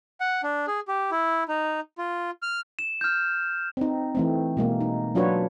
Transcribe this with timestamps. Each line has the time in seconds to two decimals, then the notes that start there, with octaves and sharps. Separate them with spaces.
0.20 F#5
0.43 D4
0.67 G#4
0.88 G4
1.11 E4
1.48 D#4
1.98 F4
2.42 F6
2.79 E7
3.01 F6 G6
3.77 C4 D#4
4.15 E3 A3 C4
4.57 B2 G#3 A#3
4.81 D#4
5.15 F#3 D4 F4 F#4 B4 C#5